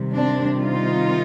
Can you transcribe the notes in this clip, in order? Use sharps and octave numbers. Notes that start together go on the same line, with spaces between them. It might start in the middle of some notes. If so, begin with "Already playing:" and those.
Already playing: C3 D#3 G3
C4 D4
D#4 F4